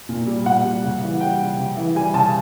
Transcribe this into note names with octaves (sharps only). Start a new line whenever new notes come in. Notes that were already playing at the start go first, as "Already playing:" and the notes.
A#2
G3
A#2 F#5
G3
C#3
E3
G3 G5
C#3
C#3
E3
G3 G#5
C#3 A5